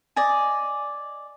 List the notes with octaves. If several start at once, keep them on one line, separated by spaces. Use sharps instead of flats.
D5 D#5 G#5